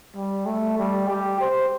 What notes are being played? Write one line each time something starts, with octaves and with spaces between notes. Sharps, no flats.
G3
A3
G3
G4
C5